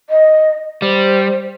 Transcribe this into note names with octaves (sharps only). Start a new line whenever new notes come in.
D#5
G3 C5